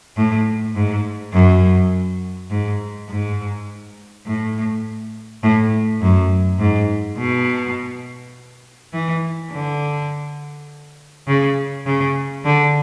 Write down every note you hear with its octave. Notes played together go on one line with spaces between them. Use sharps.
A2
G#2
F#2
G#2
G#2
A2
A2
F#2
G#2
B2
E3
D3
C#3
C#3
D3